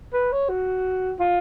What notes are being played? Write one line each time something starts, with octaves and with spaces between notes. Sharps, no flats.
B4
C#5
F#4
F4